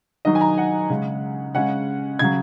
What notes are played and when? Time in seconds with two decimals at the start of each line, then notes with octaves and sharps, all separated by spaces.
0.25 D#3 F#3 D#4 D#5
0.35 G#5
0.41 A#5
0.58 F#5
0.90 C#3 G#3 C#4
1.55 C#3 G#3 C#4 F#5
2.19 C#3 F#3 G#6